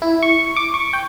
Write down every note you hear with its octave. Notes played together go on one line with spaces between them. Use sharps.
E4
C#6
D6
C#6
G5